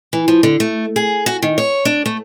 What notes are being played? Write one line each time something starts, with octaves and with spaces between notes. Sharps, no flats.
E3
F3
D3
A3
G#4
F#4
D#3
C#5
D4
A3